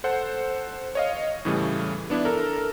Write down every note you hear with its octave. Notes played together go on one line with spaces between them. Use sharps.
A4 C5 F#5
C#5 D#5 F5
A2 C#3 E3 G3 A3
B3 D4 E4
A4 A#4